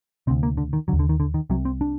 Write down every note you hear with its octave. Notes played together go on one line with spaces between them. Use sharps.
D2 C3 C4
A#3
D3
D#3
D3 F#3
D#2
D3
D#3
D3
D#3
C2 C3 F#3
C4
D4